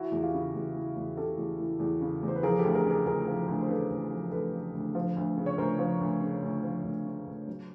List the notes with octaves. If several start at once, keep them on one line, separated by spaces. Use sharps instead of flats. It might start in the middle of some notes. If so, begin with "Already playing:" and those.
Already playing: E3 E4 F#4
E2
F4 G4
C#3
E2
E3
E2
C#3 G4 A4
E2
E3
E2
C#3
E2
C5
B4
F3 G#4 A#4
G4 A4
D2
G#4 A#4
C#3
G#4 A#4
D2 G#4 A#4
F3
D2
C5
C#3 A4 B4
D2
F3
D2 A4 B4
C#3
D2
F3
D2
C#3
C#5
D2 A#4 C5
F3
D2
C#3
D2
F3
D2
C#3
D2
F#3